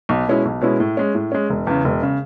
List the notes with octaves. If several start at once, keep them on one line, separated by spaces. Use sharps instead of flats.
B1
B2 G#3 C#4 E4
B1
B2 G#3 C#4 E4
A2
G#3 C#4
A2
G#3 C#4
E1
E2 C#3
E1
C#3